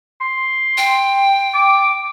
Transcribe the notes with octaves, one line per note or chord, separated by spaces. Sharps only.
C6
G5
D6